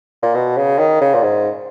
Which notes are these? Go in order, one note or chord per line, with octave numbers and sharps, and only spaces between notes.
A#2
B2
C#3
D#3
C#3
A#2
G#2